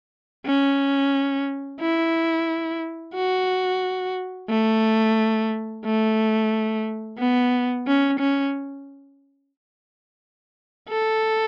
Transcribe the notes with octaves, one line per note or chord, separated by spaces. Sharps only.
C#4
E4
F#4
A3
A3
B3
C#4
C#4
A4